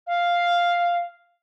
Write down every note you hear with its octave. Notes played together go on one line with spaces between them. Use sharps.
F5